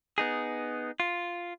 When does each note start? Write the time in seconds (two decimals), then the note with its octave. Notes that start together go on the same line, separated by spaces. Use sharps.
0.18 B3 D#4 G#4
1.00 F4